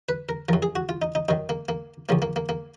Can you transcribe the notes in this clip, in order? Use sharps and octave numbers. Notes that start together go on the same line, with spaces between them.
B4
A#4
F#2 F3 A#4
G#4
F#4
F4
D#4
D#4
F#2 D#3 D#4
A#3
A#3
C#2 C#3 F3 A#3
A#3
A#3
A#3